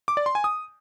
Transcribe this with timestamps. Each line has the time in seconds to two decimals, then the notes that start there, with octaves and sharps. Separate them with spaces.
0.08 D6
0.17 D5
0.26 C6
0.35 G#5
0.44 D#6